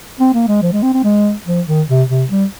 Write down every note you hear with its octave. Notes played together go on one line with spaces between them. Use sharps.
C4
A#3
G#3
F3
G#3
C4
C4
G#3
F3
D#3
C3
C3
G3